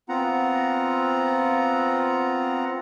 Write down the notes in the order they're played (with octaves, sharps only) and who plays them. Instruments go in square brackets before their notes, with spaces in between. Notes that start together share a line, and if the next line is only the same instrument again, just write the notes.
[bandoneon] B3 C4 F4 F#5 A#5